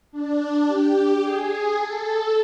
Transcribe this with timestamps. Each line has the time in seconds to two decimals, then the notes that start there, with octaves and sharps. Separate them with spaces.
0.11 D4
0.66 G4
1.20 G#4
1.75 A4